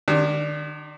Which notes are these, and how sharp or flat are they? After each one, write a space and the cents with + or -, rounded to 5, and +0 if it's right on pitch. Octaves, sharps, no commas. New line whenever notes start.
D#3 -45 D4 +0